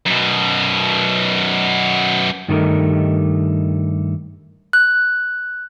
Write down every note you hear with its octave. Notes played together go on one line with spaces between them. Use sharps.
F#2 B2
G2 D#3 G3 A3 D#4 A#4
F#6